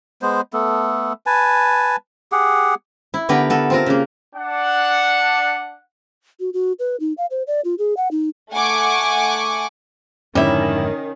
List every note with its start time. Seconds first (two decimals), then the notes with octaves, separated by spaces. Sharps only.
0.22 G#3 B3 C5
0.53 A3 B3 A4
1.26 B4 G#5 A5
2.32 G4 G#4 F#5
3.14 E4
3.29 D3 B3 G4 A#4 B4
3.50 B3 A4 A#4
3.70 C4 F4 A#4
3.86 C#3 A#3
4.35 D4 F#5
6.40 F#4
6.53 F#4
6.79 B4
7.00 D#4
7.18 F5
7.30 C5
7.47 D5
7.64 F4
7.78 G#4
7.97 F#5
8.11 D#4
8.52 A3 F#5 G#5 C#6 D6
10.35 F2 G#2 D3 D#3 G3 C#4 E4